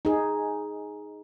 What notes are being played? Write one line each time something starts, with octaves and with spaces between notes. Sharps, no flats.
D#4 G#4